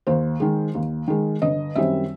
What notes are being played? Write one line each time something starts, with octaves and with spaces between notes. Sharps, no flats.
D#2 C5
D#3 G#3
D#2
D#3 G#3
G1 D#5
F#2 D#3 G3 C4 E5